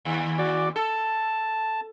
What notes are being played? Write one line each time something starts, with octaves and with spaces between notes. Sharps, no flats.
D#2
F#4 D5 D6
A4 A5